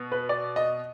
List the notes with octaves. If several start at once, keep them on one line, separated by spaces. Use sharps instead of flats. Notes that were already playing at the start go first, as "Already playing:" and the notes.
Already playing: B2
B4
D5
D#5